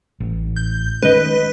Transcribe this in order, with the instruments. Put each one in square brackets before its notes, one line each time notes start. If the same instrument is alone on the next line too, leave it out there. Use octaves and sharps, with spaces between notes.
[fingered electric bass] A1
[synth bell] G6
[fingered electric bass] D#3 G#3 C#4 [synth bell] B4 D#5